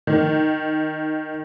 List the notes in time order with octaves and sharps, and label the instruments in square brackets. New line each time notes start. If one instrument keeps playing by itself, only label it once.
[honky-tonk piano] D#3